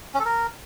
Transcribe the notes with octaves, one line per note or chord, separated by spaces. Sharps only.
C#4
A4
A#4